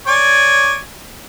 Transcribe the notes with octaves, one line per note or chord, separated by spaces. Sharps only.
C#5 D5 G#5